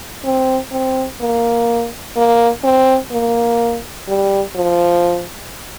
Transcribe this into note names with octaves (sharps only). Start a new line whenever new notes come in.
C4
C4
A#3
A#3
C4
A#3
G3
F3